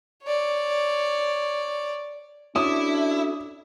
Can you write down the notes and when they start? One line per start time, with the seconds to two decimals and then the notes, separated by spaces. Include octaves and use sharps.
0.23 C#5 D5
2.56 C#4 D4 E4 F#4 A4 D6 D#6